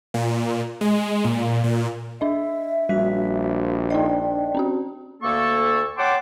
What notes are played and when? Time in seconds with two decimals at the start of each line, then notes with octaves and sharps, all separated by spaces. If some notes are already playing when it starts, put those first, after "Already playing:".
0.14 A#2
0.81 G#3
1.25 A#2
1.64 A#2
2.21 D4 D#5 E5
2.89 A#1 G3 F#4 B6
3.90 D4 D#4 D5 D#5 G5
4.55 C4 C#4 F#4
5.23 D2 A#3 A4 C#6
5.97 C#5 F#5 G5 A5 C6 D6